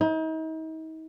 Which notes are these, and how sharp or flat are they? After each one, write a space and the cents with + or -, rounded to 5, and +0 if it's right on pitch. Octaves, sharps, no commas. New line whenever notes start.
D#4 +40